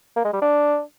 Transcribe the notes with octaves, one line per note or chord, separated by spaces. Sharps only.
A#3
G#3
G3
D4